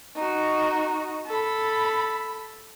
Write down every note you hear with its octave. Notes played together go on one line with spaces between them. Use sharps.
D#4 F#4
A4 B5